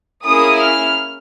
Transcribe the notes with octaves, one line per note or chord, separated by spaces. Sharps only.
A#3 C#4 E4 G#4 D#6
F6